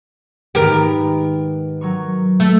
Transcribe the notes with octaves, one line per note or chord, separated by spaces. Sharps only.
G#2 D#3 B3 G4 A#4
F#3 A#4 C#6
A3